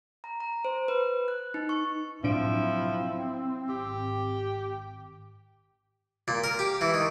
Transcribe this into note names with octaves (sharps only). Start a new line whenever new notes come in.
A#5
A#5
C5
B4
F#6
D#4
C#6
A2 F3 F#3 C4 D4 E4 D7
G#1 G4
A#2
A#4
G4
E3
D#3